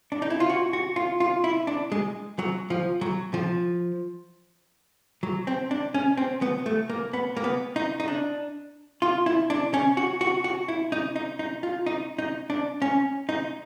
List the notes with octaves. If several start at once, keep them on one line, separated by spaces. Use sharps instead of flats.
D4
D#4
E4
F4
F#4
F#4
F4
F4
E4
D4
G#3
F#3
F3
F#3
F3
F#3
C4
D4
C#4
C4
B3
A3
A#3
B3
A#3
B3
D#4
D#4
D4
F4
E4
D4
C#4
F#4
F#4
F#4
E4
D#4
D#4
D#4
F4
D#4
D#4
D4
C#4
D#4